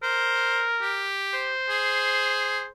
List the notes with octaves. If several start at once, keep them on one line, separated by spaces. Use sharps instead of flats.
A#4 C5
G4
C5
G#4